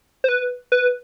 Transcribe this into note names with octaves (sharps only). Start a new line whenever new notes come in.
C5
B4
B4